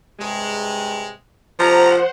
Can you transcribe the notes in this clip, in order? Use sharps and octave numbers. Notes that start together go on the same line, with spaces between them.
G2 C3 G#3
C3 F3 A4 C5 F#5 A#5